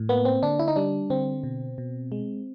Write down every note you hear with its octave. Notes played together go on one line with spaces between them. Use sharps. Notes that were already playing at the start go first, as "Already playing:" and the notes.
Already playing: A2
A#3 B3
C4
D3 D4
E4
D#4
G3 D4
D3 C4
B2
B2
G#3